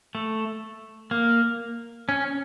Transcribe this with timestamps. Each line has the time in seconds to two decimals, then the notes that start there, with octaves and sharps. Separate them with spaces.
0.15 A3
1.11 A#3
2.09 C#4